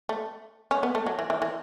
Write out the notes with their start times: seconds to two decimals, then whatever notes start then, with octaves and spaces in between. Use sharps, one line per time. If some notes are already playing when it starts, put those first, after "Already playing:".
0.09 A3
0.71 C#4
0.83 B3
0.95 A3
1.06 F#3
1.19 E3
1.30 E3
1.42 E3